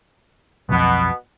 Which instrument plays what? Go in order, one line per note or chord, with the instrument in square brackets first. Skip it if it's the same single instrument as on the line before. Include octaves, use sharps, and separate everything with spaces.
[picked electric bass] B1 F2 [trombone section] B2 B3